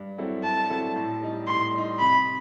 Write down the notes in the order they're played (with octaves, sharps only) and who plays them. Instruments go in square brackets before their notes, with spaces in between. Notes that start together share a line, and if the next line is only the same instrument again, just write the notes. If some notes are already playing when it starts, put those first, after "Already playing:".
Already playing: [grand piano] G2
F#3 C4 E4 A4
[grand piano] G2 [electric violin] A5
[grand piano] F#3 C4 E4 A4
A2
G3 D#4
[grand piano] A2 [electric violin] C6
[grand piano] G3 D#4
[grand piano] C3 [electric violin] B5